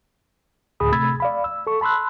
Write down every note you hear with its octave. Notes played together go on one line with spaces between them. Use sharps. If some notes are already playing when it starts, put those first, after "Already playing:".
D2 A2 G#4 B5 D#6
C3 A3 B5 E6 G#6 A6
D5 F5 B5
E6
A4 C#6
A5 B5 C6 E6 F#6